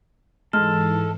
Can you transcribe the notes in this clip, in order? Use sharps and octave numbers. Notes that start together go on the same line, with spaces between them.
G#2 E3 G#3 A4 F6